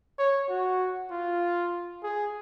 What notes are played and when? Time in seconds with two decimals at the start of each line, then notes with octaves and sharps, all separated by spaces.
0.19 C#5
0.49 F#4
1.10 F4
2.04 G#4